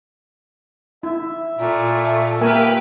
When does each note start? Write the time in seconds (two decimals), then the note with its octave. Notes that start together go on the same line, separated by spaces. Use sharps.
1.03 E4 E5
1.59 A#2 A3
2.41 A#3 G4 A#4 B4 G#5